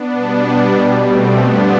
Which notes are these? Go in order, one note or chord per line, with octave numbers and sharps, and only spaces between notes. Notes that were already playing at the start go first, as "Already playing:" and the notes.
Already playing: B3 D4
B2
G3
B2 G3
A3 C4
G2 D3 F3 B3 D4